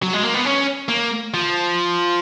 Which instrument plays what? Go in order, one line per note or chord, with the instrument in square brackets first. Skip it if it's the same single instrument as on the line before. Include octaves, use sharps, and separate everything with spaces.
[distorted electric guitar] F#3
G#3
A#3
B3
C#4
A#3
F3